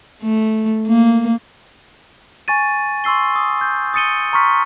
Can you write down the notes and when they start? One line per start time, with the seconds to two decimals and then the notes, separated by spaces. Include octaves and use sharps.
0.23 A3
0.87 A#3
2.48 G#5 C#6 A6 D#7
3.04 C6 C#6 E6 C7 G7
3.36 D#6
3.61 G6
3.94 D#6 A6 C#7 D#7 G7
4.33 A#5 C6 C#6 F6 B6